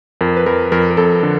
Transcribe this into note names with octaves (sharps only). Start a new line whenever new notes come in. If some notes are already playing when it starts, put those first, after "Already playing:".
F2 A#4
B4
F2 A#4
F2 A#4
A#4
F2 A4
D3